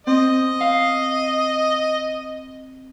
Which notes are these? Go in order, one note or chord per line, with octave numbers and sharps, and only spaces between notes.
C4 D#5
F5